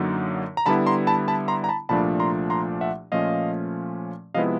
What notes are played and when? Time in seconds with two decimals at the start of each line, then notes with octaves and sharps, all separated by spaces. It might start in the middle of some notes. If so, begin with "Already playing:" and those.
Already playing: F#2 D3 F#3 A#3 D#4
0.57 A#5
0.66 D3 G3 B3 E4 A5 B5
0.87 A#5 C6
1.07 A5 B5
1.28 A5 B5
1.48 A#5 C6
1.64 A#5
1.69 A5 B5
1.89 C2 A#2 F3 A3 D4 A5 B5
2.20 A#5 C6
2.50 A#5 C6
2.81 E5 F#5
3.12 A#2 F3 A3 C#4 F4 D#5 F5
4.34 C3 F3 G#3 B3 E4 D#5 F5